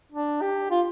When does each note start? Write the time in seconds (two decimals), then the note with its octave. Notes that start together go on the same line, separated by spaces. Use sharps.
0.12 D4
0.41 G4
0.71 F4